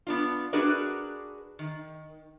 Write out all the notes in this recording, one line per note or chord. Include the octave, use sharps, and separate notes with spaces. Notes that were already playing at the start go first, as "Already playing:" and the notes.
B3 D4 F4
D4 F#4 G#4 A#4 B4 D5
D#3